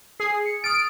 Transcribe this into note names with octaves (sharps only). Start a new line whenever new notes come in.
G#4 C7
C#7
D#6 F6 A6 D7